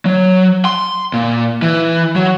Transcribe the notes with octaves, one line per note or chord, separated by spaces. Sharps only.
F#3
C6
A#2
E3
F#3